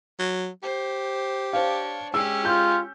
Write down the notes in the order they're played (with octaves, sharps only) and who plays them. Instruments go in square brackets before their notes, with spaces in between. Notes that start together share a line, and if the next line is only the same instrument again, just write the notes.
[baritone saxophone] F#3
[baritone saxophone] G4 [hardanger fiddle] C5
[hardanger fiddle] D4 C#5 [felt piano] C5 F5
[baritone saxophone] G#3 [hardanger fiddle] C#4 G4 [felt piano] E6
[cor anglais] F4 [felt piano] G6